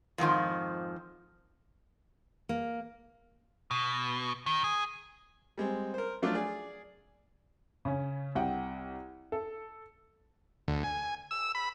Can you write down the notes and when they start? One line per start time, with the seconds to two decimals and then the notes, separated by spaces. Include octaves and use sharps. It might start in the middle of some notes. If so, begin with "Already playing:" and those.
0.18 F2 G#2 D#3 F3
2.49 A#3
3.71 B2
4.46 D#3
4.64 G#4
5.58 G3 G#3 C4
5.94 A#4 C5
6.22 F3 F#3 A3 D4 F4 D5
6.35 G#4 D5
7.85 C#3 C#4
8.35 C2 F#5 G5
9.32 A4
10.68 D2
10.84 G#5
11.31 E6
11.55 B5